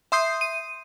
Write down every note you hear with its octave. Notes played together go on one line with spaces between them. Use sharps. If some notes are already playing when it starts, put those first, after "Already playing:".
E5 C6 D#6 G6 C7
D#7